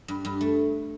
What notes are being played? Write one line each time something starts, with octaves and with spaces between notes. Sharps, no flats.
G2
G2
A3